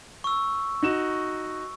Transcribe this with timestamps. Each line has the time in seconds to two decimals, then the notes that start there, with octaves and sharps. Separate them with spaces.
0.24 C#6 E6
0.83 D#4 F#4 E7